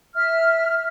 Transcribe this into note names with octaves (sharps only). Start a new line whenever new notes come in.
E5 F6